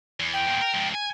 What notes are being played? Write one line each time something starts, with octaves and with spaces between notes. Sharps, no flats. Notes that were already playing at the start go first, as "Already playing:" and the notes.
E2
G5
E2 A#2
A#4
G#2 F3
G#5